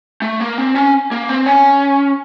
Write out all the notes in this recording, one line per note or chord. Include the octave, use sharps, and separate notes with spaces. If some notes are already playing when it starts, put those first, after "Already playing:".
A3
A#3
C4
C#4
A#3
C4
C#4